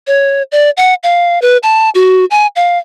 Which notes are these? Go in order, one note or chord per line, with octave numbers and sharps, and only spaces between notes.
C#5
D5
F#5
F5
B4
A5
F#4
G#5
F5